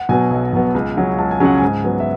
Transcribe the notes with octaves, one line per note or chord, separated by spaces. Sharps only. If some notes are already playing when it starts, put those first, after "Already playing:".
Already playing: F#5
B2 F#3 B3 G#5
B1
B2 F#3 B3
C#2
C#3 F#3 C#4
C#2 A5
G#5
C#3 F#3 C#4 F#5
G#2 G#5
F#3 B3
E5